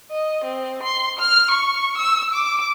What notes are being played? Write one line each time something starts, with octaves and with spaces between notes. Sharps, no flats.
D#5
C4
C6
F6
C#6
E6
D6